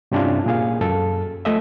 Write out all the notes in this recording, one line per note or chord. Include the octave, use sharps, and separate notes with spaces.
G2 C3 C#4 D4 E4 F4
A#2 G#4 F5
F#2 A4
F3 A3 D#5 E5